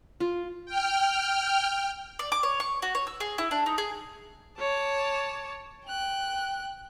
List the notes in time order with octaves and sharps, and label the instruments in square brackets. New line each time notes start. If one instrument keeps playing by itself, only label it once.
[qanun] F4
[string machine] G5 F6
[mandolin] D5
D6
C#5
C#6
F#4
C#5
E6
G#4
E4
D4
D#4
G#4
[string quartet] C#5 A5 D6
G5 F#6